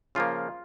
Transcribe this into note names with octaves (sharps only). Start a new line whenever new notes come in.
C#3 F3 A#3 F4